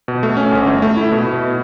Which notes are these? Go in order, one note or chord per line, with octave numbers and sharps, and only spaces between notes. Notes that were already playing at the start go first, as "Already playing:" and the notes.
B2
A3
C#4
G1
A3
A3
E4
B2
B2